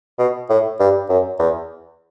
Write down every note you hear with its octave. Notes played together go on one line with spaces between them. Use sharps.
B2
A2
G2
F#2
E2